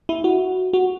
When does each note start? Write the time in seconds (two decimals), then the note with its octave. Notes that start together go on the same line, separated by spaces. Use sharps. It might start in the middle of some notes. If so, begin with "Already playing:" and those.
0.09 E4
0.24 F#4
0.73 F#4